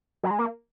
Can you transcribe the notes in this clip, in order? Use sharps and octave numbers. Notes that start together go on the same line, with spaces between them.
F#3
G#3
A#3